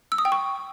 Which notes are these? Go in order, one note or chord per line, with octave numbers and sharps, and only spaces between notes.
E6
D#6
G5
C#6